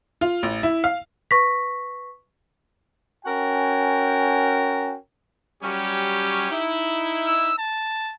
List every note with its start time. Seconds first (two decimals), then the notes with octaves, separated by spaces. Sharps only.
0.21 F4
0.43 A1
0.63 E4
0.84 F5
1.31 B4 C#6 A#6 B6
3.25 C#4 F#4 A#4 G5 G#5
5.63 F#3 G3 C#4 G4
6.51 D#4 E4
7.26 E6
7.58 A5